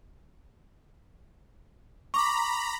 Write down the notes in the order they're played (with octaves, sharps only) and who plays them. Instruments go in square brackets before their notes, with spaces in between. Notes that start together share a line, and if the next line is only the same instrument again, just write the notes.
[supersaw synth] A#5 B5 [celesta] C#6 D6